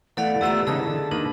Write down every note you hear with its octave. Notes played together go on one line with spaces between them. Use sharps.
E3 A3 B3 A4 D5 F5 F#5
A3 B3 F4 G4 D5 A#5 E6
C#3 E3 D#4 G#4 A5 D#6 E6
D3
D#3 A#3 D4 B4